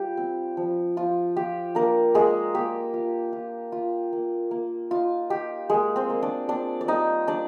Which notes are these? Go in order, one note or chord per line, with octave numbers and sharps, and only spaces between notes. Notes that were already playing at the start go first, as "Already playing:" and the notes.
Already playing: G3 F4 G4
C4
F3
F3 F4
F4 G4
A#3 D4 A#4
G#3 A#3 G#4
A#3 G4
F4
F4
F4
A#3
A#3
D#4 F4
D#4 G4
G#3 A#3 G#4
C4 C5
A#3
D4 D5
C4 D4 D5
D5
G3 D#4 D#5
G3 D4 D5